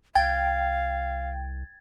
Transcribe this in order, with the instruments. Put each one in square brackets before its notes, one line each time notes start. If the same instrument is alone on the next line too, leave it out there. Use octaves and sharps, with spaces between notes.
[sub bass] C2 [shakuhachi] F5 [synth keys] G5 [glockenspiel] G#6 A6